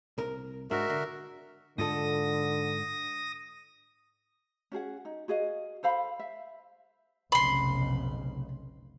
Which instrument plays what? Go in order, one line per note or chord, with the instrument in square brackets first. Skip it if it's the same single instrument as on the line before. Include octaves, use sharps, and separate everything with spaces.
[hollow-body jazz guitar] C2 A#4
[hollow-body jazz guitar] G#2 G#3 D4 [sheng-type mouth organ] F#4 A#4 E5
[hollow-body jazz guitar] D3
[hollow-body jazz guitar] G#2 F4 A4 [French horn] D3 [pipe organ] D#6 A#6
[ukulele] C#4 F#4 G#4 F#5
D#4
F#4 G#4 D#5 F5
A4 C5 F5 B5
E5
[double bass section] F1 B1 C#3 [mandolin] B5 C6